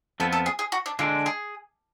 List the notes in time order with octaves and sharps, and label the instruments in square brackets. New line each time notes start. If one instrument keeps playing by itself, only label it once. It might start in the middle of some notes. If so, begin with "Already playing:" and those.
[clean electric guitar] F2 F3 B3 [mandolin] A4
[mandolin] A4
G#4
G#4
F#4
D4
[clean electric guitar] D3 G#3 D4 [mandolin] F4
[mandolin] G#4